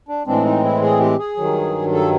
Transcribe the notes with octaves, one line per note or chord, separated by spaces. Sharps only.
D4
A2 E3 G#3 C4 D4
D#4
E4
G#4
G4
G#4
G2 D#3 F#3
A4